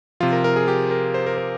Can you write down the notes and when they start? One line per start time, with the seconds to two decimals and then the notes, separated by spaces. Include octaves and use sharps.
0.20 C3 F3 F4
0.33 A#4
0.44 A#4
0.56 G#4
0.68 G4
0.91 A#4
1.14 C5
1.27 A#4
1.38 A#4